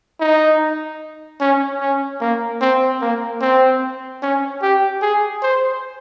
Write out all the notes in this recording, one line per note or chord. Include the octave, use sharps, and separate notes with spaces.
D#4
C#4
C#4
A#3
C4
A#3
C4
C#4
G4
G#4
C5